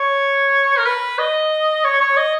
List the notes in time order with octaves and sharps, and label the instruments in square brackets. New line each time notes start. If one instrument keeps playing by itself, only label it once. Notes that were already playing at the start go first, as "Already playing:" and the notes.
Already playing: [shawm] C#5
A#4
B4
D#5
C#5
C#5
D#5